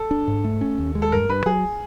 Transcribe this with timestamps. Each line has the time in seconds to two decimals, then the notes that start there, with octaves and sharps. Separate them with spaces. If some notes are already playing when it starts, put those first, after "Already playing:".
Already playing: A4
0.11 D4
0.28 G#2
0.44 A3
0.61 C#4
0.78 D#2
0.95 G#3
1.02 A4
1.12 G2 A#4
1.29 G2 B4
1.46 F#3 G#4